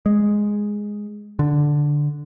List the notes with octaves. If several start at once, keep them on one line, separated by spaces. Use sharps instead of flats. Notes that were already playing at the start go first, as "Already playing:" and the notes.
G#3
D3